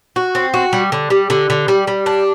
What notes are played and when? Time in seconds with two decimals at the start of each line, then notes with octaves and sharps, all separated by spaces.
0.16 F#4
0.35 C4
0.54 F#4
0.73 G3
0.92 D3
1.10 G3
1.30 D3
1.50 D3
1.68 G3
1.87 G3
2.06 D4